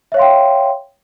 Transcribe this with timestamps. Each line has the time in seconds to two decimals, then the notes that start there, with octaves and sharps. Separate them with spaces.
0.12 E5
0.14 C#5
0.17 F5
0.19 C6
0.22 G5